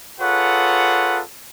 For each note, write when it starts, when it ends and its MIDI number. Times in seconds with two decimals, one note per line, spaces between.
0.20 1.22 65
0.20 1.22 68
0.20 1.22 69
0.20 1.22 71
0.20 1.22 73
0.20 1.22 78